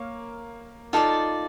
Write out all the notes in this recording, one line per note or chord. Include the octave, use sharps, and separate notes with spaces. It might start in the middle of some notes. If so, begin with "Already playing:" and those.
Already playing: A#3 C#5 F5
D#4 F4 A4 D5